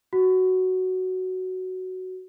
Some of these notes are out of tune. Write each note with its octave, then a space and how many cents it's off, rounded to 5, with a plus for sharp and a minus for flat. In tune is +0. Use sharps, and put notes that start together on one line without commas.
F#4 +5